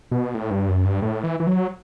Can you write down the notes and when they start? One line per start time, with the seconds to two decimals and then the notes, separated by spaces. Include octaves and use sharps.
0.11 B2
0.35 A2
0.51 G2
0.69 F#2
0.85 G2
1.02 A2
1.24 E3
1.40 E3
1.47 F#3